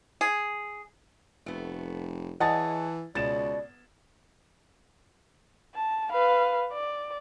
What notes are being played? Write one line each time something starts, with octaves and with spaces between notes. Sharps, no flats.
G#4
F1 A3 B3
E3 G#4 C#5 D#5 F#5 A5 A6
C#2 B2 D5 A6 E7
A5
B4 F5
D5